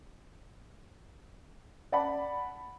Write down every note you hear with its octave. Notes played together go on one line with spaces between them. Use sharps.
D5 F#5 A5 B5